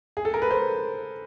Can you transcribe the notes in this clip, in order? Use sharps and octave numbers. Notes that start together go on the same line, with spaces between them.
G#4
A4
A#4
B4
C5